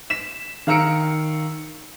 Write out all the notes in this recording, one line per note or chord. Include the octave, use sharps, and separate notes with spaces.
B6 E7
D#3 F5 A#5 E6 C#7 D7